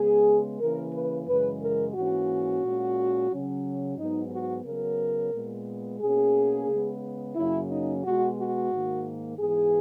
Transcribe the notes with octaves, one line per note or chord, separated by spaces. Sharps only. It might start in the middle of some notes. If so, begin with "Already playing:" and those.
Already playing: C#3 G#3 B3 G#4
C#3 E3 A#3 C#4 A#4
B4
F#2 C#3 E3 G#3 B4
A#4
G#2 E3 A#3 C#4 F#4
A#2 G#3 C#4
C#3 F#3 C#4
G#2 F#3 B3 D#4
F#4
C#3 F#3 B3 A#4
A#2 G#3 B3
B2 A#3 C#4 G#4
C#3 G#3 B3
F#2 C#3 F#3 A#3 C#4 E4
D#4
B2 G#3 B3 F#4
F#4
G#2 D#3 A#3
G#2 E3 B3 G#4